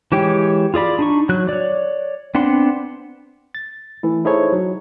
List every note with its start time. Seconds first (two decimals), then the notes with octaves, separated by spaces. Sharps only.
0.12 E3 G#3 G4 C#5 G5
0.74 F4 G#4 D5 B5
0.99 D4 D#4 C#6
1.29 F#3 F#6
1.49 C#5 D5
2.35 B3 C4 D4 F#5 C6
3.55 A6
4.03 E3 A3 E4
4.25 D#4 E4 G#4 A4 C5 C#5
4.52 F#3